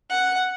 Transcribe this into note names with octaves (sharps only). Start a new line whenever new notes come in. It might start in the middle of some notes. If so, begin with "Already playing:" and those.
F#5